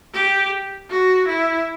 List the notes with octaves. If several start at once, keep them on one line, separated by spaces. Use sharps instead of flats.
G4
F#4
E4